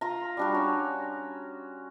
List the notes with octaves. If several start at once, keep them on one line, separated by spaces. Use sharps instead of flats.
F4 A#5
G3 D4 F#4
C#4